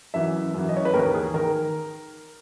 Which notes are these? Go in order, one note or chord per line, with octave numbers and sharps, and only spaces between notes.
F#2 E3 E5
F#2 E3
D#5
C#5
B4
D#2 D#3 A#4
G#4
D#3 A#4